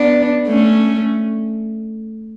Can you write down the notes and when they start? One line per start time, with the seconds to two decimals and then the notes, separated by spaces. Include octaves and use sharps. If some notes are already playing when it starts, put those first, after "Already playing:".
Already playing: B3 D4
0.48 A3 C#4